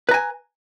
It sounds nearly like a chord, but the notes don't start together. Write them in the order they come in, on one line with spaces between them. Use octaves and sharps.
B4 A#5 G#5